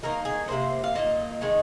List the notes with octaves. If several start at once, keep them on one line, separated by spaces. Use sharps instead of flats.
D#3 A#3 D#4 A#4
G#4
C3 F3 A#3 C5
F5
A#2 A#3 D#4 D#5
D#3 G#3 D#4